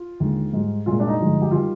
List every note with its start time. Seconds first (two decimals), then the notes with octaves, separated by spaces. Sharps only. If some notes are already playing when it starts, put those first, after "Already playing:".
Already playing: F4
0.20 D#2 D3 G#3
0.53 G#2 G3
0.86 C2 A#2 G#3 F4
1.00 D4
1.08 D#4
1.19 G2 D3 F3 G#3
1.42 G4
1.51 D#3 G3 F4